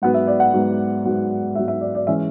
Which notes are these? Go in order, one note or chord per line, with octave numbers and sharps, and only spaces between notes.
G#2 F#3 B3 F#5
E5
D5
F#5
G#2 F#3 B3
G#2 F#3 B3
G#2 F#3 B3 E5
E5
D5
D5
E3 G#3 C#4 E5